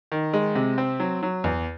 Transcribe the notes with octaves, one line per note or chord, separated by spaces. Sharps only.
D#3
G#3
C3
C4
F#3
F#3
E2